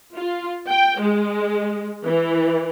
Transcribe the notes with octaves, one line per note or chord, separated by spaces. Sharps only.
F4
G5
G#3
E3